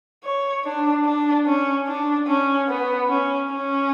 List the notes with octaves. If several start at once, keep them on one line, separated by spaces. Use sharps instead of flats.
C#5
D4
D4
C#4
D4
C#4
B3
C#4
C#4